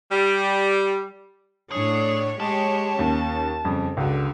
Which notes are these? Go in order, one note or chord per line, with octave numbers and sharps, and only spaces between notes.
G3
A2 D4 G#4 C#5
G#3 G4 C#5 A5
D#2 C#4
F2 C#3 G3
C#2 D3 F#4